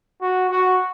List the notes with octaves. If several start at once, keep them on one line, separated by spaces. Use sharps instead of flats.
F#4
F#4